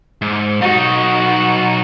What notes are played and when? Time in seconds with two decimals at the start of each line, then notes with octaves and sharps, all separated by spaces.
0.22 G#2
0.61 B1 D#4 F#4